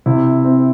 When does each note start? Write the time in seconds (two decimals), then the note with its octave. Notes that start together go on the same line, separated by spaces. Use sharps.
0.06 C3 E4
0.44 C4